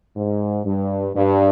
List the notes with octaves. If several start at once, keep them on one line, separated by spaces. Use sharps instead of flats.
G#2
G2
G2